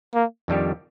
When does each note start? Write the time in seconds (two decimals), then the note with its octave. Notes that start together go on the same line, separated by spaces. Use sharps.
0.14 A#3
0.48 F2 D#3 G3 D4 G4